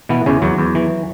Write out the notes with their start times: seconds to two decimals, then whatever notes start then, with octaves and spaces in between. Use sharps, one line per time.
0.09 B2 E3 B3
0.26 E2 C#3 C#4
0.42 E2 F#3 F#4
0.58 E2
0.75 E3